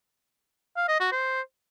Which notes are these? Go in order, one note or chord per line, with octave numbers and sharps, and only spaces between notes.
F5
D#5
F#4
C5